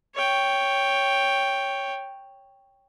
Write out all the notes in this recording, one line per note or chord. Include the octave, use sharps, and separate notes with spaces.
C#5 G5